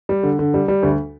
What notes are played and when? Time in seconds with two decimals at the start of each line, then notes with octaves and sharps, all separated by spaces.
0.09 G3
0.23 D3
0.39 D3
0.54 G3
0.68 G3
0.83 D2